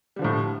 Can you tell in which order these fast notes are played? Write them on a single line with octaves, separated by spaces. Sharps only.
G3 D3 F3 A2